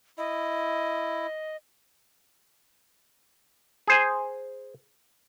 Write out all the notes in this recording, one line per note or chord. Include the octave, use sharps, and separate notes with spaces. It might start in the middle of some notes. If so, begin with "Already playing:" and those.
E4 D#5
G#4 C5 G#5